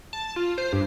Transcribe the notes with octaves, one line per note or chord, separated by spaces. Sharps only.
A5
F4
C5
G2